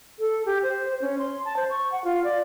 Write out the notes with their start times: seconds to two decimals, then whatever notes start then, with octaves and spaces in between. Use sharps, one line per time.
0.19 A4
0.46 G4
0.63 C5
0.89 C5
1.01 C#4
1.19 C6
1.45 A5
1.56 C5
1.70 C#6
1.92 F#5
2.04 F4
2.24 D5